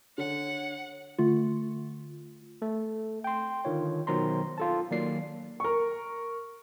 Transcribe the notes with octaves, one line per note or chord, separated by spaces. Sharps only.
D3 C#5 F#5
D3 A3 F4
A3 A4
G5 C6
D3 D#3 F4 C#5
B2 D#3 F#3 C5 A#5 C6
F4 A4 A5
D#3 F#3 A#3 D5 C7
A#4 C#6